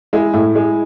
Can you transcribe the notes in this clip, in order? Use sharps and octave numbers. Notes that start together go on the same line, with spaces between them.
G#3 E4
A2 E4
G#3